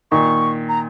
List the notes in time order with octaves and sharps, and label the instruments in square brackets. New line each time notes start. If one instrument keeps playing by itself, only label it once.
[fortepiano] A#2 D#3 [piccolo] C#6
[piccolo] A#5